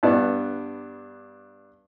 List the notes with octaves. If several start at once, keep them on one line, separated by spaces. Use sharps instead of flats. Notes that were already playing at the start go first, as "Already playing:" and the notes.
G2 B3 D4